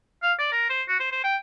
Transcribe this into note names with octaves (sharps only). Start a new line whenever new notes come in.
F5
D5
A#4
C5
F#4
C5
C5
G5